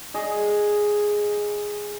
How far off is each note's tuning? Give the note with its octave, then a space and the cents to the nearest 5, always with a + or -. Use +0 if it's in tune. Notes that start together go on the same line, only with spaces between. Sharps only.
G#4 +0 D#5 +0